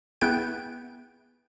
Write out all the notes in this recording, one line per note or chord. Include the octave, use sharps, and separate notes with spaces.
B3 E4 G#4 G5 D7